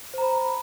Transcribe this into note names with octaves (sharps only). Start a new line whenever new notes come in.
C5 A#5 B5